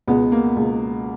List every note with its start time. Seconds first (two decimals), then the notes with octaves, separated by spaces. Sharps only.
0.07 C#2 B2 G#3 B3
0.32 A#3
0.56 C#2 B2 G#3